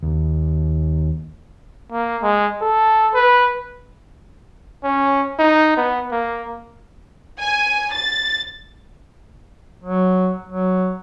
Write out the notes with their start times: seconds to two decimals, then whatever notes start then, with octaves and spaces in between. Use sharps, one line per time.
0.03 D#2
1.92 A#3
2.23 G#3
2.62 A4
3.14 B4
4.84 C#4
5.39 D#4
5.77 B3
6.12 A#3
7.39 G#5
7.94 A6
9.84 F#3
10.48 F#3